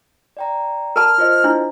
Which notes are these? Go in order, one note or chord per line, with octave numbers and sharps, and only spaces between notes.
D5 G5 A#5
A#4 A5 F6
F4 C5 D#5
D4 E4